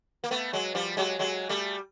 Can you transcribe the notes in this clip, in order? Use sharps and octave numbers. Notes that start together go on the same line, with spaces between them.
A#3
A3 B3
F#3 G#3
F3 G3
F#3 G#3
F#3 G#3
G3 A3